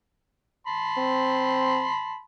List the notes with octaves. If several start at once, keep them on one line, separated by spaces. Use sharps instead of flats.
A5 B5 C6
C4